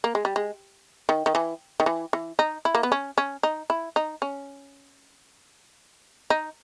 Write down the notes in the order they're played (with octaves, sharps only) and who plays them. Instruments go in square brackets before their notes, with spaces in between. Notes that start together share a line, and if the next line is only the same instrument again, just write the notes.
[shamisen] A#3
G#3
G3
G#3
D#3
D#3
E3
D#3
E3
E3
D#4
E4
A#3
B3
C#4
C#4
D#4
E4
D#4
C#4
D#4